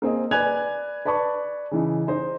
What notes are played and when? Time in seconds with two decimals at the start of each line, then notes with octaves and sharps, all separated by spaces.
0.02 A#3 C4 G#4 D#5
0.31 B4 D5 G#5 F#6 G#6 F7
1.05 B4 D5 A5 B5 C#6
1.71 C#3 E3 D#4
2.07 D#4 C5 D#5